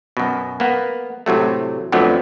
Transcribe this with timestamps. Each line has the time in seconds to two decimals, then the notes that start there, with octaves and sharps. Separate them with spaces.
0.17 F#2 B2
0.60 A#3 B3
1.26 A2 C3 F#3 A3
1.92 F2 D3 F3 F#3 A3 B3